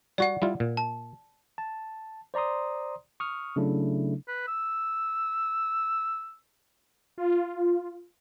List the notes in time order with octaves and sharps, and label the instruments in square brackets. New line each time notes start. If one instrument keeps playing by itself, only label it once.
[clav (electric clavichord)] G3 F#4 [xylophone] D5 F#5
[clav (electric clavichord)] G3 E4 F4
A#2
[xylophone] A5
[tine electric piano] A5
C5 D5 A#5 C6 D#6
C#6 D#6 F6
C#3 F#3 A3 D4 E4 A4
[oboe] B4
E6
[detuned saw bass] F4